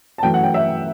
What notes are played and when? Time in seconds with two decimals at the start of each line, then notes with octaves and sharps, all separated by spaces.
0.18 A5
0.23 F#2 E3 A3 G5
0.34 F#5
0.43 G5
0.54 E5